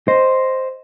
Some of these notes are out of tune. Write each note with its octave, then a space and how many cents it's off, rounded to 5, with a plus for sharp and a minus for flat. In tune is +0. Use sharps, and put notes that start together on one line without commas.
C5 +0 D#5 +0